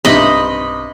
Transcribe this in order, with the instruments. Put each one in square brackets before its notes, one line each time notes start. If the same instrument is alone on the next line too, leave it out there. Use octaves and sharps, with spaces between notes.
[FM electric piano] B1 [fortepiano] G2 C3 D#4 [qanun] D#5 B5